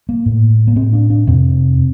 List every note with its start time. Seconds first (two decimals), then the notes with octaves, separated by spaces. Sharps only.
0.09 A#3
0.26 A2
0.67 A#3
0.76 A2 C4
0.93 D4
1.10 D4
1.27 F2 C3 C4